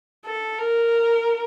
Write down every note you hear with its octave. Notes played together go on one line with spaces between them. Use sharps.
A4
A#4